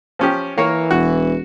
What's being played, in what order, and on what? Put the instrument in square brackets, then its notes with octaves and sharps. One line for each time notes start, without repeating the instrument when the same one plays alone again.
[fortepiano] F3 C#4 G4
[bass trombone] E3 [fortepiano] A#3 A#4 C#5
[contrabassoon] E1 [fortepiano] F#4